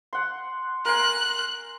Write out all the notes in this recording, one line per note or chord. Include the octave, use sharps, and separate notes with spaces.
F#5 C6
A#4 G#5 C6 F#6